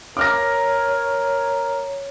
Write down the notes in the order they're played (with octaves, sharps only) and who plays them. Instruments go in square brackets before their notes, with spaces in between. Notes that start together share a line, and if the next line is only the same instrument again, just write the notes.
[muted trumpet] A#4 [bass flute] C#5 [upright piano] D6 F6 A#6